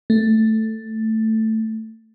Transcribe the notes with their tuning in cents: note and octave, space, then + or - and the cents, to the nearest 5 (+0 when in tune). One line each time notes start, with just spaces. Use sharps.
A3 +5